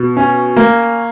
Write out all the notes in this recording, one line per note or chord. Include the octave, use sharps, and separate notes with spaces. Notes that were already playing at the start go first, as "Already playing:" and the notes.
Already playing: B2
C#4
A#3